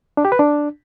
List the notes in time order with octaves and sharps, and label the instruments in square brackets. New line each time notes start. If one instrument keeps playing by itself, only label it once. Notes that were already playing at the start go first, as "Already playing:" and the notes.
[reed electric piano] D4
G4
B4
D4